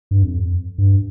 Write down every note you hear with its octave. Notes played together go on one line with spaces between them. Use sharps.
G2
F2
G2